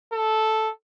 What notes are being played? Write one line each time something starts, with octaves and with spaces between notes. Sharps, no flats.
A4